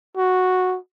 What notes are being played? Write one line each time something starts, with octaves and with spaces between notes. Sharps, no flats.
F#4